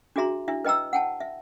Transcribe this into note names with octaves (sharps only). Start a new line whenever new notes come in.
D4 F#4 G#4 E5 A#5 C6
D4 E4 E5
B4 D#5 G5 A#5 E6
F#5 G5 A5
E5